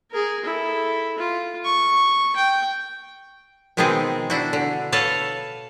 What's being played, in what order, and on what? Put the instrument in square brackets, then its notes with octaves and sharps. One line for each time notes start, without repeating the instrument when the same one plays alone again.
[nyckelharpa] G#4 A#4
E4 A4
F4
C#6
G5
[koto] B2 D#3 G#3 B3 C4 G#4
D4 E4 F#4
D3
A4 B4 C#5 F5 F#5 A5